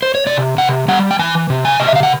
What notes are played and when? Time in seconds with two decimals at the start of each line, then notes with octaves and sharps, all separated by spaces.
0.02 C5
0.15 C#5
0.27 C3 D5
0.58 C3 F#5
0.88 G3 F#5
1.11 G5
1.19 E3 G#5
1.50 C3
1.65 G#5
1.80 C3 D#5
1.88 E5
1.96 F5
2.03 F#5